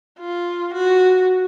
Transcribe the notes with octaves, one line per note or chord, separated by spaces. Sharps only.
F4
F#4